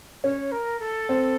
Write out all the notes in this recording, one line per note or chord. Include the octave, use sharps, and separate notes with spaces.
C#4 C#5
A#4
A4
C4